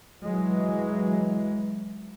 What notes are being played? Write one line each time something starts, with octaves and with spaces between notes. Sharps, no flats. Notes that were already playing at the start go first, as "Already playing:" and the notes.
E3 F#3 G#3